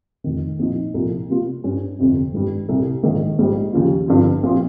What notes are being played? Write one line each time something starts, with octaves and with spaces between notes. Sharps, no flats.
F1 F2 D#3
A#1 A#2 F3 C4 D#4
C2 A#2 F3
C3 G3 A#3 F4
G2 G3 C#4
G1 F2 C3
G#1 G2 G3
C2 C3 G3
A#1 G#2 D#3 A#3
A#1 G#2 G3
D#2 C#3 F3
G1 G2 F3 C4
A#1 A#2 F3 C4 F4